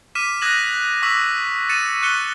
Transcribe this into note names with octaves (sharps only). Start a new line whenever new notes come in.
D6 F6 B6 D#7 E7
D#6 F#6 G#6 A#6 E7 F#7
C#6 D6 E6 B6 F#7
A6 C#7 D#7 E7
C#6 F#6 C#7 E7 G7